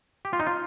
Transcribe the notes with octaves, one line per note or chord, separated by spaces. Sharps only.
G4
F4
D#4
F4